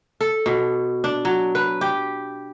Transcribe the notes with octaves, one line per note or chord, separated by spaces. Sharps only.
A4
B2
D4
F#3
B4
G4